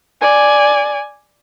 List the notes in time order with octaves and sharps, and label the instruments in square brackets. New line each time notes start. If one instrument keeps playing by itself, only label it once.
[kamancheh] D5 G#5